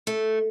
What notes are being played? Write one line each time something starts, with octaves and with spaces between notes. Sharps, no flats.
A3